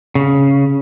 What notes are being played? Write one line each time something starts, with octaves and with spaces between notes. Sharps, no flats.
C#3